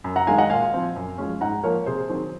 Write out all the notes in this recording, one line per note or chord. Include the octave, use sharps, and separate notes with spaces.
F#2
F#5 A#5
D#3 G#3 D#4 F5 G#5
D#5 F#5
A#2 F5 G#5
F3 C4
F#2
F3 G#3 C#4
G#2 F#5 A#5
F3 A#3 A#4 C#5
C3 G#4 C5
D#3 F#3 C4